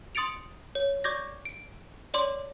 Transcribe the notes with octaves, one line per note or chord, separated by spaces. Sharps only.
C6 D#6 A6 C#7 D7 F7
C#5
D5 C#6 D6 G6 G#6 A#6
D7
C#5 D5 C6 D6